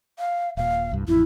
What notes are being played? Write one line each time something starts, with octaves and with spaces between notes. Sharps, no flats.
F5
D#1 A#2 F5
C2 G2
A1 F2 E4